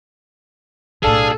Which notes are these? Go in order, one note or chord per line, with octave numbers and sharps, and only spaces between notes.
B1 A2 D4 G#4 A4 F5